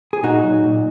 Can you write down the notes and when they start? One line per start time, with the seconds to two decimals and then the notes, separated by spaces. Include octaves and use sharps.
0.13 G#4
0.23 A#2 D#4 F#4
0.43 F#3
0.63 A#2